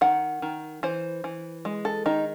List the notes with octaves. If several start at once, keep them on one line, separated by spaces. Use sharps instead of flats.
D#3 F#5
D#3
E3 C5
E3
G#3
A4
D#3 D#4